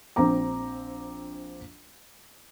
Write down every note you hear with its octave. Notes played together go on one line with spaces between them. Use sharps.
A#1 C4 D4 A#5 D6